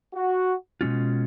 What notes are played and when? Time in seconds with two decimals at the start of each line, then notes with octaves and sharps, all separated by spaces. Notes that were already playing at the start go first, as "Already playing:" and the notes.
0.14 F#4
0.81 B2 G#3 C#4 F4